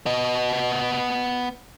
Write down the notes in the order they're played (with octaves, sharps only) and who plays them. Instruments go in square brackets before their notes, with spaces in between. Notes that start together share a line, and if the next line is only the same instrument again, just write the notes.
[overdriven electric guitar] B3 D#5